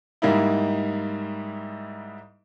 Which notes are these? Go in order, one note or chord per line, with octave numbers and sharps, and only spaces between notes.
G#2 G3 A#3 D#4 E4